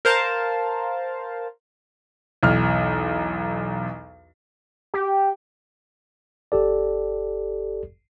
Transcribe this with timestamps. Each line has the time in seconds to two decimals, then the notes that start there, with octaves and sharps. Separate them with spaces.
0.05 A#4 C5 F5 A5
2.43 B1 E2 F6
4.94 G4
6.52 G1 G4 A4 D5